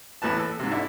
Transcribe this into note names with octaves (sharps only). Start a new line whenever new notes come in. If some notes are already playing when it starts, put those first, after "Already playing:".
E2 A2 E3 B4 A5
A4
G#2 C3
D3 E4